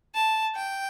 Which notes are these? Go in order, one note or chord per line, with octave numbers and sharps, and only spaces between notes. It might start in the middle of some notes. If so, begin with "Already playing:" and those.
A5
G5